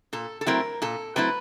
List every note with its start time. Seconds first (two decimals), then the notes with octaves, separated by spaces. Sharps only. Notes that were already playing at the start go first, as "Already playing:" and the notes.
0.13 A#2 A4
0.41 A4
0.46 F#3 A3 C4 E4 A#4
0.82 A#2 A4
1.16 F#3 A3 C4 E4 B4